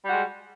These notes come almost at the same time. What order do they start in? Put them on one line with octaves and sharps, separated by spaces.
G3 F#4 G#3